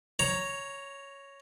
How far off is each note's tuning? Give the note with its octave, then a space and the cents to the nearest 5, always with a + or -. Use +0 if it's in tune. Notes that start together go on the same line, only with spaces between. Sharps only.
C#5 +0 A#5 +0